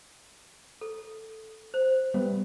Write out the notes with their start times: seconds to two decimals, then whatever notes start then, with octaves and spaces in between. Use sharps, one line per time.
0.81 A4
1.74 C5
2.14 G3 B3